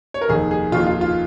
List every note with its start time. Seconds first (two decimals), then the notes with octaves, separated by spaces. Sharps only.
0.14 C#5
0.21 A#4
0.29 F1 D#2 D#3 G#4
0.51 G#4
0.72 F1 D#2 D#3 F4
0.86 F4
1.01 F4